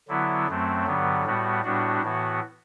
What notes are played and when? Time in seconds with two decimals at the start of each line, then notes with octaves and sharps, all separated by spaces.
0.08 D3 F#3 B3 E4
0.48 F#2 F#3 A3 C4
0.86 G2 D3 F#3 B3
1.25 A2 G3 B3 F#4
1.63 A2 G3 B3 D4 F#4
2.02 A2 E3 B3 F#4